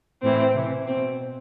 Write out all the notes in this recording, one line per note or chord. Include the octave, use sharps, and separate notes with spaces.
A2 E3 C4
C3 E3
B2 C4